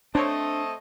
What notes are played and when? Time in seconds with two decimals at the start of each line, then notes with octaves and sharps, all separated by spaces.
0.15 A3 C4 D4 C5 C#5 D#5